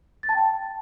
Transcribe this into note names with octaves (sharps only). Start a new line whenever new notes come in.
A6
A5
G5